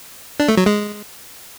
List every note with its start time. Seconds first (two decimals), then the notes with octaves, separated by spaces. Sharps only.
0.40 D4
0.48 A3
0.57 F#3
0.66 G#3